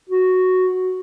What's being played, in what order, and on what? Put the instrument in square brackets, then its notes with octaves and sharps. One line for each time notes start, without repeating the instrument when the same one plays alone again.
[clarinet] F#4